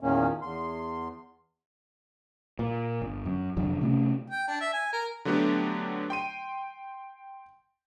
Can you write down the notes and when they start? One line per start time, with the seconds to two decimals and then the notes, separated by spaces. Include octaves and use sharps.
0.01 E2 A#2 D#3 A#3 C#4
0.42 E2 C6
2.59 A#2
3.02 G1
3.25 F#2
3.56 F1 F2 D3 F#3
3.81 C3 A3 C#4
4.30 G5
4.48 D4
4.61 E5
4.73 G#5
4.93 A#4
5.25 D3 F#3 A3 B3 D4 G4
6.10 G5 C6 D#7